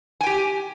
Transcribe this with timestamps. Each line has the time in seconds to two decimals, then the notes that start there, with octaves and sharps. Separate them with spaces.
0.21 G#5
0.23 G5
0.26 G4